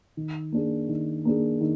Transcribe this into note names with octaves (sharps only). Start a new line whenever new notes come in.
D#3
A#3 D4 G#4
D#3
A#3 D4 G#4
D#3